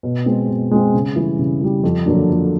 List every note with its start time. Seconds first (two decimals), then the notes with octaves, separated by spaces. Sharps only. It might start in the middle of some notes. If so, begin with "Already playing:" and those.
0.03 B2
0.26 G#3 C4
0.48 B2
0.71 G#3 C4
0.94 C#3
1.16 E3 G3
1.39 C#3
1.61 E3 G3
1.83 F2
2.06 D3 F#3 A#3 D4
2.29 F2